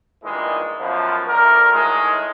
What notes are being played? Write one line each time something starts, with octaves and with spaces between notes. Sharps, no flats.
G2 A#2 D#3 E3 G#3
F#2 B2 F3
D2 A#4
A2 D#3 G#3